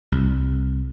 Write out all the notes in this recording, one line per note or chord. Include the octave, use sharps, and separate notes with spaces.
C2